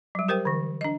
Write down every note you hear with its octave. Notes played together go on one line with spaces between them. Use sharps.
F#3 G3
G4 A#4 C5 G5
D3 E3
D4 D#5